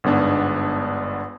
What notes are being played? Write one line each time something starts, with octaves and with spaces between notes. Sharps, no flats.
G1 G#2 B3 D4